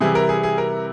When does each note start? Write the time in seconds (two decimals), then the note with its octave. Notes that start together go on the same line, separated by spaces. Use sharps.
0.01 C3 E3 G3 G#4
0.15 A#4
0.29 G#4
0.43 G#4
0.58 A#4